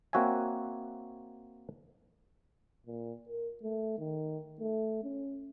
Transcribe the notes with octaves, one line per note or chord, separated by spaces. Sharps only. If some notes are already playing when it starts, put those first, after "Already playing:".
A#3 C4 F#4 C#5 E5 G#5
A#2
A#4
A3
D#3
A3
C#4